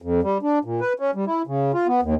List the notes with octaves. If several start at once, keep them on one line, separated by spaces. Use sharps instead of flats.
F2
G3
D4
A#2
B4
C#4
G3
E4
C#3
F4
B3
D#2